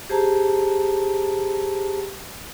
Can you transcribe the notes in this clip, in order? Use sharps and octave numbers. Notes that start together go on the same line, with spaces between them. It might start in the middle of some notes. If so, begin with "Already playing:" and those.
G4 G#4 C5 A5 A#5